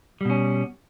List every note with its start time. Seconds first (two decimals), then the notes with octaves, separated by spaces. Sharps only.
0.21 G3
0.25 B2
0.30 C#4